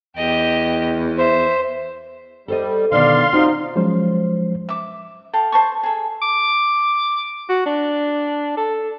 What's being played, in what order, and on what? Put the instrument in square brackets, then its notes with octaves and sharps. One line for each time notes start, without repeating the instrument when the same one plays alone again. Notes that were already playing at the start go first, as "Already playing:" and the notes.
[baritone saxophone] E2 [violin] G4 D#5
[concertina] C5 [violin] E5
[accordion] G3 [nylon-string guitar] A4 C5 D#5
[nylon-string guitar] B2 D3 D#3 [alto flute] D5 [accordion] F5 C6
[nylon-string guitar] C4 F4 F#4 [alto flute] D#4
[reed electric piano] F3 F#3 G#3 C#4 C5
[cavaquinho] E5 D6
A4 F5 G5
C5 A5 C#6
G#4 A4
[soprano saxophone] D6
F#4
D4
A4